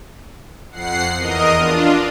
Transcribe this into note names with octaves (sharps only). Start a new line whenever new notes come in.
F2 F#5 C7
E2 A#4 D#5 D#6
D4 F4